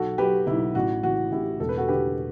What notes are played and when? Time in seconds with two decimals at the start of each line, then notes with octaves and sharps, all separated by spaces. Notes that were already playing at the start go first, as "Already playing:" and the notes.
Already playing: B1 F#4 A4
0.18 F#3 G4 B4
0.47 B1 E4
0.75 A1 F#4
1.03 E3 F#4
1.32 A1 E4 G4
1.60 E1 A4
1.69 B4
1.77 F#4 A4
1.88 D3 G4 B4